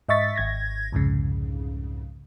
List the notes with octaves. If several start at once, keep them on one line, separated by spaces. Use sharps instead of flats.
G#2 D#5 E5 C#6 A6 B6
G#1 G#6 A#6
C2 F2 G#2 C#3